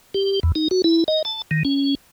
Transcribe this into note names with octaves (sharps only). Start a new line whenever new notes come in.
G4
E2
D#4
F#4
E4
D#5
A5
D#3
C#4